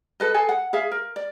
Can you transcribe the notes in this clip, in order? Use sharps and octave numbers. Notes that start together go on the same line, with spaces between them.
A4 B4 D#5
G#4 A4 G#5
F#5
G#4 E5 F5
A#4
D5